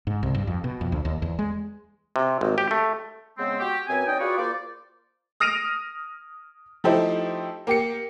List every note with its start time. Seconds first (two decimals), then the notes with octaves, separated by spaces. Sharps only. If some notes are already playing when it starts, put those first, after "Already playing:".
0.07 G#2
0.23 C2
0.35 G2
0.47 F2
0.64 B2
0.81 F2
0.92 D2
1.05 D#2
1.22 E2
1.39 G#3
2.16 C3
2.41 G#1
2.58 G4
2.71 A3
3.37 C#3 G#3 B3 C4
3.59 F#4 G4
3.87 F#2 C4 B4 G#5
4.07 C#4 D#4 D5 D#5 G5
4.19 F4 F#4 G#4 B4 C#5 D5
4.37 A#3 F4 C5 D5
5.40 D#6 F6 A#6 D7 D#7 F7
6.84 F3 A3 D#4 E4 G4 C5
7.67 A#3 G4 C#7